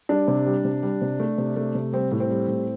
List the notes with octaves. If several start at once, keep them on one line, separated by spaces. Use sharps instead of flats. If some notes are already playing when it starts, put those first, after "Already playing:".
G3 D4
C3
G3
C3
G3
C3
A3
C3
A3
C3
G3 C4
A2
C4
G3
A2